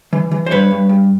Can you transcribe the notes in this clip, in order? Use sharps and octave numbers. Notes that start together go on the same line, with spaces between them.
E3
E3
C5
G2 B4 C#5
G2
G2